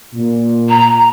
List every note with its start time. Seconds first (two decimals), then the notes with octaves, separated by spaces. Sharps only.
0.14 A#2
0.69 A#5